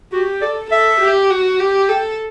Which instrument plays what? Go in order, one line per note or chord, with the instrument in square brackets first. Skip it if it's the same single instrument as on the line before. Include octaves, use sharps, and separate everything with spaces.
[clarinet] F#4 [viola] G4
[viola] A4 [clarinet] D5
[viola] A4 [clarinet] E5
[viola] G4
F#4
G4
[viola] A4 [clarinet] G5